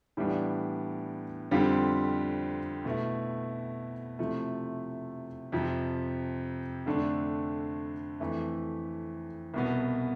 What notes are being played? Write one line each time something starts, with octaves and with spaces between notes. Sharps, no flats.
A2 E3 G3 B3 D4
F2 D3 G3 C4 F4
B2 A3 E4
C3 F3 A3 E4
F2 C3 F3
F2 D3 A3 D4
F2 E3 A3 E4
C2 B2 B3